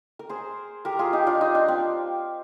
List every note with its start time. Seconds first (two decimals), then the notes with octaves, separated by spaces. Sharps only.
0.19 A#4
0.29 G#4 C5
0.85 G4 A#4
0.99 F4 G#4
1.13 D#4 G4
1.26 D4 F4
1.41 D#4
1.55 D4
1.68 C4